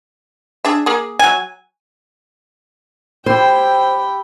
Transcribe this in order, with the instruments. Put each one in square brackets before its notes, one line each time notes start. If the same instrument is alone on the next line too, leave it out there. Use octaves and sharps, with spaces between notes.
[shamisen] D4 G#4 E5
A#3 G#4
[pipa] F#3 G#5
[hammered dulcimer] E4 G4 [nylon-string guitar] C5 [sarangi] G5